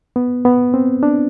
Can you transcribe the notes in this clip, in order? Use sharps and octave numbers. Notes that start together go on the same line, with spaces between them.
B3
B3
C4
D4